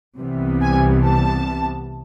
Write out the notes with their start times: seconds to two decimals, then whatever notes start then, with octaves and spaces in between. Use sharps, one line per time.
0.17 C2 C3 E3 G3 B3
0.62 G#5
1.07 A5